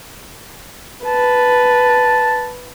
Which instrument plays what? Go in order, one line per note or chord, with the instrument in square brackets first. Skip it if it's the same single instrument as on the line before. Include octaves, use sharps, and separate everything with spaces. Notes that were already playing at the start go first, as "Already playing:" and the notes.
[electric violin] B4 [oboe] A5